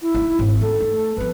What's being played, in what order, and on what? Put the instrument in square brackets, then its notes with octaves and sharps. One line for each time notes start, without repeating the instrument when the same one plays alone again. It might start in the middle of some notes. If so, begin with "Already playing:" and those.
[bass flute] E4
[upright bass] D#4
G#1
[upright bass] D#4 [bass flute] A4
[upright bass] A3
[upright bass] F3 B3 [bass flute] B4